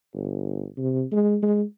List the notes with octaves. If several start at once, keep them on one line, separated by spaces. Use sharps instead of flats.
G1
C3
G#3
G#3